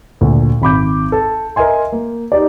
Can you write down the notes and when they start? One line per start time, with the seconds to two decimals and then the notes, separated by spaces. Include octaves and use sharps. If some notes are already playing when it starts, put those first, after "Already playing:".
0.21 D2 A#2
0.62 G#1 B5 D6 G6
1.12 A4
1.56 A#4 D#5 E5 G#5 C6
1.92 A#3
2.32 D#4 G4 D5